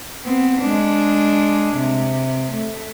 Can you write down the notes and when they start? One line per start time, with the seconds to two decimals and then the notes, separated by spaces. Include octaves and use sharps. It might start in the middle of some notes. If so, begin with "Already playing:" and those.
0.24 B3 C4
0.61 G#3 D4
1.76 C3
2.53 A3